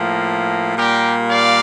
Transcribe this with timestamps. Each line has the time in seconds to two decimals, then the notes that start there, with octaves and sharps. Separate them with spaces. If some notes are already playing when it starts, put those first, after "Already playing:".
Already playing: A2 F3 A#3
0.76 A#2 G3 A#3 G4 A#4
1.29 D5 F5